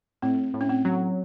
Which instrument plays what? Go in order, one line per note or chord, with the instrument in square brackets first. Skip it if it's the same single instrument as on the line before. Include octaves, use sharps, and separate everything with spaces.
[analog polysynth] A2 [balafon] C4
[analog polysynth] A2
[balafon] C#4
C4
[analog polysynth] F#3